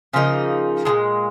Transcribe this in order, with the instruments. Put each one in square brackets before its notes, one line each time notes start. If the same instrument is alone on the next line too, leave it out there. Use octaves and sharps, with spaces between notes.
[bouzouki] C#3 F3 A#3 D#4
A#2 F3 G#3